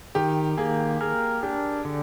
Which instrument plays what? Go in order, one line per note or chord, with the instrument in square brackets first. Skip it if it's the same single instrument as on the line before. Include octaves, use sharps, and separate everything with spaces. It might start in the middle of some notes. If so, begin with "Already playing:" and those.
[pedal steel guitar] D#3 [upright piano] G4
[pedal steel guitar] A#3 [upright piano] G#4
[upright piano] G#4 [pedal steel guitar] A#4
[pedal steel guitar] D4 [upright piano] G4
[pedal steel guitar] D3